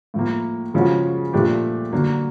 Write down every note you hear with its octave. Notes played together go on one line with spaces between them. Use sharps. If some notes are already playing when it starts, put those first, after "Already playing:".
A2 F3 A#3
C#3 F3 G#3 C#4 F#4
A#2 F3 A3 D4 G4
D3 F#3 A#3